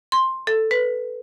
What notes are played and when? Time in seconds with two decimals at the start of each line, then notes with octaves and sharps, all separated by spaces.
0.12 C6
0.47 A4
0.71 B4